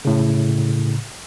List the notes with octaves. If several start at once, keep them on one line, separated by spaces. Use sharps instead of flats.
A2 C#3